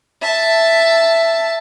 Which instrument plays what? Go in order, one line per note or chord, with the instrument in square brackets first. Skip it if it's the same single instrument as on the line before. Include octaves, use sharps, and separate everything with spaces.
[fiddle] E5 A5